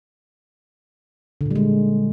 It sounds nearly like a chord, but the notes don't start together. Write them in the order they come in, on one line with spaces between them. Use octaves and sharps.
D3 A#2 G3 G#3